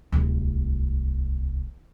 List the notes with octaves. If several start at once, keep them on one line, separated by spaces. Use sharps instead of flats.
D1 C2